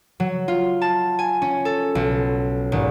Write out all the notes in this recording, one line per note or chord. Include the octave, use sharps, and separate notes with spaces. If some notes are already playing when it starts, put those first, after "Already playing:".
F#3
F4
A5
G#5
C#4
A4
B1
G#1